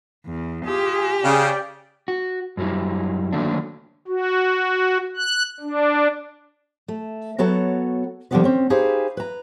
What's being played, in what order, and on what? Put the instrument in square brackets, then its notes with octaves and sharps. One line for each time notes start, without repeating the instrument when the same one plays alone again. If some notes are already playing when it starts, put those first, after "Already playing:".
[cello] E2
[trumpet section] F4 G#4 [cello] G4
[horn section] C#3 [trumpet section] D5 G5
[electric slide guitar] F#4
F#2 F#3 G3 E4
D3 D#3 F#3 A3 A#3 D4
[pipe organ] F#4
F#6
D4
[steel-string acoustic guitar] A3
F#3 B3 F#4 A4 C#5 A#5
D3 F3 G3 B3 D#4 B4
C4 C#4
D#4 G4 G#4 B4 C5 F5
B4 A#5